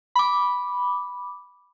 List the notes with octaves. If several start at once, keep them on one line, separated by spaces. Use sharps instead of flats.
B5 D6